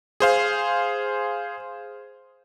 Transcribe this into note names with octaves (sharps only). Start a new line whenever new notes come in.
G#4 C5 F5